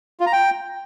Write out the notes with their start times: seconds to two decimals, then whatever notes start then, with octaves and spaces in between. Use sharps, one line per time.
0.20 F4
0.26 A#5
0.33 G5